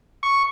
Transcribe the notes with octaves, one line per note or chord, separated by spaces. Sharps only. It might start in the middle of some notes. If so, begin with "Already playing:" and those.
C#6